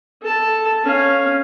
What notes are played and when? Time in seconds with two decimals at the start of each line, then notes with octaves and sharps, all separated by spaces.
0.22 A4 A5
0.84 C#4 F5